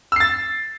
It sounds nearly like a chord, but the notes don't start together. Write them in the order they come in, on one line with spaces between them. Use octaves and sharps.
E6 C7 A6